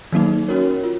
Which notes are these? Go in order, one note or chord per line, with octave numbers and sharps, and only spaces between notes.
D#3 F#3 A#3 D#4
C#4 F#4 A#4 C#5
F4